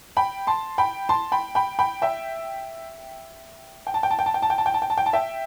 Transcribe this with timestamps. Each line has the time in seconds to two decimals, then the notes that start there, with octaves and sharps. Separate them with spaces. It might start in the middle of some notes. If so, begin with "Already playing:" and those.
0.17 G5 B5
0.47 A5 C6
0.78 G5 B5
1.09 A5 C6
1.32 G5 B5
1.55 G5 B5
1.79 G5 B5
2.02 E5 G5
3.87 G5
3.94 A5
4.03 G5
4.11 A5
4.19 G5
4.26 A5
4.34 G5
4.42 A5
4.50 G5
4.58 A5
4.66 G5
4.74 A5
4.82 G5
4.90 A5
4.98 G5
5.06 A5
5.13 E5 G5